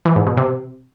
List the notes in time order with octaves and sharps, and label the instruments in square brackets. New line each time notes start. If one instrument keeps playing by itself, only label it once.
[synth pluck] E3
G#2
B2
C3